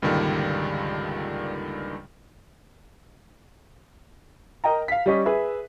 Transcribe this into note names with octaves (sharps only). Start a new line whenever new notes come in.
C#2 G2 A#2 D3 D#3 G3
A#4 D#5 G5 A#5
F5 B6
G3 C#4 D#5
G#4 B4 E5